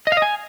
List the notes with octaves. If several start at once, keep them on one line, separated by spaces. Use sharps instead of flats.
D#5
F5
D#5
G#5